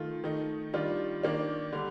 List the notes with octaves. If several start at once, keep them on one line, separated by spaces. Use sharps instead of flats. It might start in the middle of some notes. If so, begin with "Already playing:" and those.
Already playing: D#3 A3 F4
D#3 A3 D#4
D#3 G3 D4 F4
D#3 A#3 D4
D3 G3